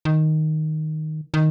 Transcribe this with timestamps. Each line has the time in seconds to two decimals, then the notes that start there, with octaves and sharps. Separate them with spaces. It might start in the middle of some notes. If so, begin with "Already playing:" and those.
0.05 D#3
1.34 D#3